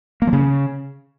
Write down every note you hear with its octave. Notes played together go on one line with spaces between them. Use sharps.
A#3
F3
C#3